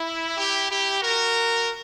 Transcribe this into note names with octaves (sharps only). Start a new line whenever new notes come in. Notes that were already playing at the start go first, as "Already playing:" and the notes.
Already playing: E4
E4 G4
E4 G4
F#4 A#4